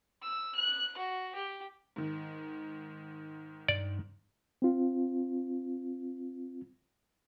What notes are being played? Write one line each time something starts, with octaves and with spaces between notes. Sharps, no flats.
E6
F#6
F#4
G4
G#2 D#3
G2 D5
C4 F4